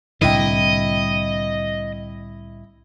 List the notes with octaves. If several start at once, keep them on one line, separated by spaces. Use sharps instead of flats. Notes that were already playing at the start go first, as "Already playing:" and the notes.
C2 A2 D3 E4 D#5 G5